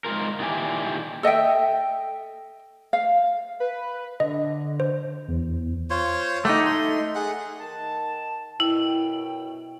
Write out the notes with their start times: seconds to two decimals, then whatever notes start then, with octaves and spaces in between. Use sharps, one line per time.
0.05 G#2 B2 F4 A#4
0.39 A#2 D#3 E4 G4 D5 G#5
1.23 A4 D#5 E5 G5
2.93 F5
3.60 B4
4.20 D3 D#5
4.80 C5
5.28 E2
5.90 F4 C5 C#5
6.45 A3 D#4 G4 F#5 G5
6.66 C6
7.15 G#4 F#5
7.60 D#3 A5
8.60 F#2 B2 E4 G5